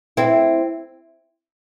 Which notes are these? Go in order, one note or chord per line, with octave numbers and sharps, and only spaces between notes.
C4 E4